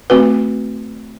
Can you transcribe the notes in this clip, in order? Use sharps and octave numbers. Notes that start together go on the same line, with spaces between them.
A3 C4 F#4 B4